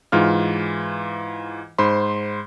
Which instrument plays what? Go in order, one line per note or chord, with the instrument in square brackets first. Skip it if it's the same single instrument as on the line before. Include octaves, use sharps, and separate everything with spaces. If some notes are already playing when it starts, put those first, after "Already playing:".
[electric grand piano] G#2 E3 F4 F6
G#2 C5 B5 C6